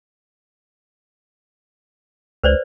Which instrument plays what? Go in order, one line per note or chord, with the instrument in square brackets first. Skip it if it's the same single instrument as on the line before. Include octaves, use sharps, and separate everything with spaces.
[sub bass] C#2 [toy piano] B4 C5 D5